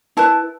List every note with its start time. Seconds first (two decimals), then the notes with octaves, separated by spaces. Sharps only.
0.17 E4 B4 A5